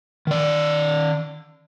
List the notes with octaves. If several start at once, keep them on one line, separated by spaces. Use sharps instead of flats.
D#3 D5